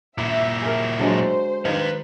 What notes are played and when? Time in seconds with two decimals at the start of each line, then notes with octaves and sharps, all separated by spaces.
0.18 A#2 E4 E5
0.62 G#4 A#4
0.99 D3 F#3 G#3 C5
1.65 D#3 D#4 B4 F5